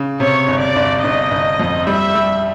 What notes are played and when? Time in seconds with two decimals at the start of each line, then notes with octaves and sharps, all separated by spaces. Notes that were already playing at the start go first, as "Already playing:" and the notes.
Already playing: C#3
0.20 C3 C#5
0.48 G1
0.62 D5
0.76 G1
1.04 G1 D#5
1.31 G1
1.60 F2
1.87 G3 E5
2.15 G3